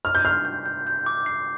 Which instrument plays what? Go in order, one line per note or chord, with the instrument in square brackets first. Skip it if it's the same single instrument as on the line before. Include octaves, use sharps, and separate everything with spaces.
[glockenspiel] D6 [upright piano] F6
[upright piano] G6
[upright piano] F6 [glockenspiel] C7
[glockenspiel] G6
G6
G6
D6
C7